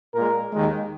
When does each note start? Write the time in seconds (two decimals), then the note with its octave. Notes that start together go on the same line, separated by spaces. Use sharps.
0.14 A#2 G#3 A#4
0.52 D#2 D#3 G#3